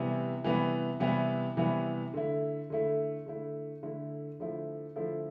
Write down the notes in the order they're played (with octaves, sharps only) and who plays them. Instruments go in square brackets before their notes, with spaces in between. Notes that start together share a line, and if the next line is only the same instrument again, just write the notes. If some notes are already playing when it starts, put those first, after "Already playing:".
Already playing: [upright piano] C3 E3 G3 B3 E4
C3 E3 G3 B3 E4
C3 E3 G3 B3 E4
C3 E3 G3 B3 E4
D3 A3 E4
D3 A3 E4
D3 A3 E4
D3 A3 E4
D3 F3 A3 E4
D3 F3 A3 E4